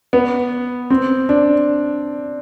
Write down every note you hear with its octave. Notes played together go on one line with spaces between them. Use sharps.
B3
C4
D4